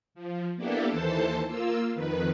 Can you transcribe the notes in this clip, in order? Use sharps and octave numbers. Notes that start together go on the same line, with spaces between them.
F3
A#3 B3 D4 E4 G4 A4
D#2 E3 A4 C5 A5
A#3 F4 E6
F2 D#3 B4